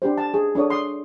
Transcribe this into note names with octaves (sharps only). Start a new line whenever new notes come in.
D4 G4 C5
A5
G#4
D4 A4 C#5 D#6
C6 D#6